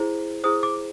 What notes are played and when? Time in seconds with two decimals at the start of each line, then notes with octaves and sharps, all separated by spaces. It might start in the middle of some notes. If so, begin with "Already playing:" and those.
Already playing: E4 G#4 C5
0.44 E4 G#4 C5 D#6
0.63 D6